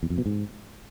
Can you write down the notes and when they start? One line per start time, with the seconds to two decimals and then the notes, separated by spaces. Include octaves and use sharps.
0.03 E2
0.10 F2
0.18 B2
0.26 G#2